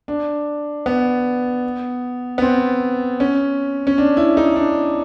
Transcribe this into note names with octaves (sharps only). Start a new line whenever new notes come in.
D4
B3
B3
C4
C#4
C#4
D4
E4
D#4
D4